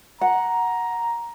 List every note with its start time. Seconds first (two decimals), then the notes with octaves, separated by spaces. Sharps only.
0.21 F#5 A#5